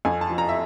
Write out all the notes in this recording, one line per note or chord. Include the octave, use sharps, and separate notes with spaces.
F2 G#5
A5
F3
A#5
E5